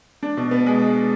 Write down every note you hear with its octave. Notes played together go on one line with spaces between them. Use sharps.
D4
B2
B3
G#3